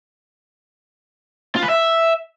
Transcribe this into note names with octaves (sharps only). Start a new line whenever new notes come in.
F4
B4
E5